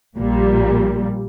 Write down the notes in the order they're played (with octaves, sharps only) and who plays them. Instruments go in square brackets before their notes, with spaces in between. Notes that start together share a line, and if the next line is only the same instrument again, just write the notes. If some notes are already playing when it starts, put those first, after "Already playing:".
[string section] A#1 A#2 G3